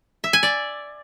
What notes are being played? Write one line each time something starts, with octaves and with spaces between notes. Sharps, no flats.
E5
G#5
D5